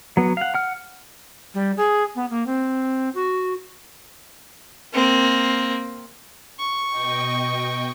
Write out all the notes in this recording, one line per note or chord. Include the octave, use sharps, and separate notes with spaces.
F#3 B3
F5 F#5
F#5 F6
G3
G#4
B3
A#3
C4
F#4
A#3 C4
C#6
B2 D#5 G5